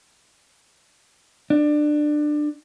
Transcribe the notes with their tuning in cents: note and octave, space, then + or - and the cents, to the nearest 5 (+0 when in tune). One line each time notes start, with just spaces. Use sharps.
D4 +20